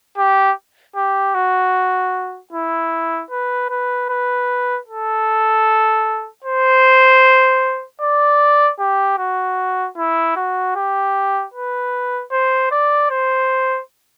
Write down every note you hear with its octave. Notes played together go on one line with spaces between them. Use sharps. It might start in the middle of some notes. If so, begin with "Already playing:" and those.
G4
G4
F#4
E4
B4
B4
B4
A4
C5
D5
G4
F#4
E4
F#4
G4
B4
C5
D5
C5